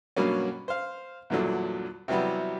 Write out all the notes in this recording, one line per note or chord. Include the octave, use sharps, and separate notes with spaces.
G2 B2 F#3 A#3 C#4
C5 F5
E2 G2 A#2 D3 F#3
C3 E3 F#3 G3 B3